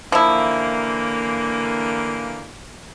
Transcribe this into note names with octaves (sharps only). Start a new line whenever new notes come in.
D3 E3 F3 A#3 E4